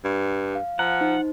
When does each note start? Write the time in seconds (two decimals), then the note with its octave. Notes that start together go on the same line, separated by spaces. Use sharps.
0.04 G2
0.55 F5
0.79 F3 F#5 A#5
1.01 D#4 C5